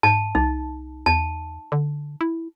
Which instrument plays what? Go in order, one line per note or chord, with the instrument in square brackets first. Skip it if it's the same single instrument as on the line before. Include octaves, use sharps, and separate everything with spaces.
[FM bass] G#2 [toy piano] A5
[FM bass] C2 [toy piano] D#4
[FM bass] E2 [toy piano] A5
[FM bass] D3
E4